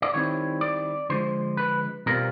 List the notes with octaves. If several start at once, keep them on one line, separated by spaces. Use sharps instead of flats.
D5
D#3 G3 C4 E4 C#5
D5
D3 F3 G#3 C5
B4
B2 G3 C4 F4 A#4